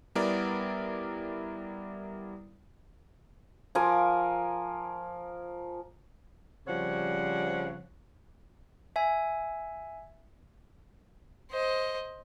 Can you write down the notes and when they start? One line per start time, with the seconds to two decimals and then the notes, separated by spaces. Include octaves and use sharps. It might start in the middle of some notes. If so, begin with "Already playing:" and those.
0.15 G3 B3 E4 A#4 D5
3.75 F3 A#4 G#5 D6
6.67 C#3 F3 G3 C4 C#5 F#5
8.96 E5 G#5
11.51 C5 D#5